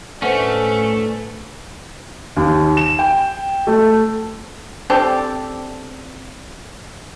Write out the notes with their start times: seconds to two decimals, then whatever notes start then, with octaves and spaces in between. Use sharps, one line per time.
0.22 A2 A3 C#4 D4 B4 C5 F#5
2.36 D#2
2.77 E7
2.99 G5
3.67 A3
4.90 C4 D4 G4 A4